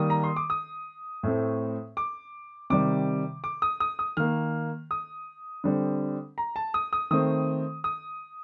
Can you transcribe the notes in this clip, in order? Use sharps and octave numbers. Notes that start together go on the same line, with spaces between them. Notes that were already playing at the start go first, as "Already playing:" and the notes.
Already playing: D#3 G3 A#3 D#6
A#5
C6
D6
D#6
A2 A3 C4
D6
C3 D#3 G3 D6
D6
D#6
D#6
D#6
D#3 A#3 F6
D#6
D3 G3 C4
A#5
A5
D#6
D#6
D#3 A3 C4 D#6
D#6